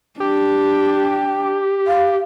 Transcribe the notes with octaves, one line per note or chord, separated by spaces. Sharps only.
D4 G4
F5